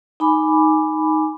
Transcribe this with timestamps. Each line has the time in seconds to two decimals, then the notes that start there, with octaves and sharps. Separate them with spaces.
0.20 D#4 G#5 B5 D6